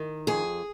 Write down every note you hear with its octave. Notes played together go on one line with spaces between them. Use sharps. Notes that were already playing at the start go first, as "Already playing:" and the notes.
Already playing: D#3
F2 G#4